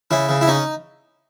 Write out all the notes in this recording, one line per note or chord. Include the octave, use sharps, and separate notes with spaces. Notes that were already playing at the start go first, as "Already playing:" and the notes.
C#3 E4
C#3
E4
C#4 D#4